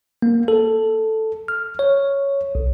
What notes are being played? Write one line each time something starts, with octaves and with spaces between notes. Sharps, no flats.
A#3
A4
F6
C#5
B1